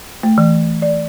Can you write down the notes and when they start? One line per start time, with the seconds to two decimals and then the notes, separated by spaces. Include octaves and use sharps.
0.23 A3
0.38 E3
0.82 D5